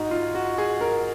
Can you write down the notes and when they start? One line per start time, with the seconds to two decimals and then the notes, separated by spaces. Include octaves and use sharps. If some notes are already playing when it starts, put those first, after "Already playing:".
Already playing: G#2 D#4 F#4
0.11 F4
0.34 F#4
0.58 G#4
0.81 A#4